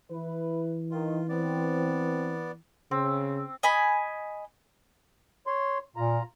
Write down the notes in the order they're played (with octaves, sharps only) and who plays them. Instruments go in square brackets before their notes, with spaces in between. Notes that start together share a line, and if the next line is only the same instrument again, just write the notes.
[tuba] E3 [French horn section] E4 B4
[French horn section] D#3 [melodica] F4
[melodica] B3 D5 [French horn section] C4
[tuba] C#3 [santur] C4
[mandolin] D#5 G#5 B5
[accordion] C#5 C6
[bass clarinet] A#2 [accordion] F4 A#5